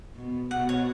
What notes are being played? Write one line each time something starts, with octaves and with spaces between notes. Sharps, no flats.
B2
B2 F#5
C#5